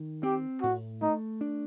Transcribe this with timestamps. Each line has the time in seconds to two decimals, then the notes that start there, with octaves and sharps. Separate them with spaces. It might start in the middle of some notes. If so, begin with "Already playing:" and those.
Already playing: D#3
0.23 C4 G4
0.62 A2 F#4
1.02 A3 D#4
1.41 D4